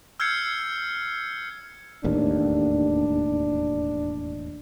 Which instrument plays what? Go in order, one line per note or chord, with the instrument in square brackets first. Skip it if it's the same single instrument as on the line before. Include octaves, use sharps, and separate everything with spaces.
[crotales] E6 F6 G6 G#6 C7 C#7
[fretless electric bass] E1 A1 D#2 [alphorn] D4